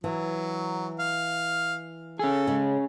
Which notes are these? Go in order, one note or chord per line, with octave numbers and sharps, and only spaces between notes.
E3 F#3
F5
C#4 G#4 A4
C#3 G#3